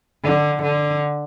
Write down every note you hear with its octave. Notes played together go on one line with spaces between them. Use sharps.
D3
D3